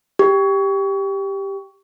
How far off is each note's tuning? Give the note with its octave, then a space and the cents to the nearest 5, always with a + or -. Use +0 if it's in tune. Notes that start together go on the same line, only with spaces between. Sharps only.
G4 +5